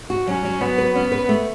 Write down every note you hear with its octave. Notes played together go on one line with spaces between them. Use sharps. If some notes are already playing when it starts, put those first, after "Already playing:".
F#4
F#3 C#4
F#3
F#3 B3
B4
B3 C#4
B4
A3